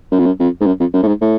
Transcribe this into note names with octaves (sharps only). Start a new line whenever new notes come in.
F#2
F2
F#2
F2
G#2
F#2
F2
F#2
A2
G#2
A2